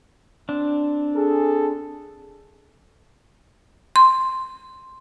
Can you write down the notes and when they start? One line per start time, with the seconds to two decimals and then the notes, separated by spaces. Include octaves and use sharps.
0.49 C4 D4
1.15 G#4 A4
3.96 C6